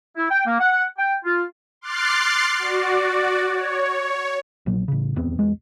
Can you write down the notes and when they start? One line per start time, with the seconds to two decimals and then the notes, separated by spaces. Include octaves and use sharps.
0.16 E4
0.29 G5
0.45 A#3
0.59 F#5
0.98 G5
1.24 F4
1.81 C6 D6 F6 F#6 A6 C7
2.59 F#4 D5
3.50 C#5
4.66 A#1 A#2 F#3
4.88 A1 C#3
5.16 D1 E2 B3 C4
5.39 B1 E2 G#3